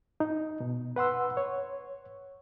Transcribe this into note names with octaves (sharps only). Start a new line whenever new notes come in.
D#4
B2
B4 F#5 C6 E6
C#5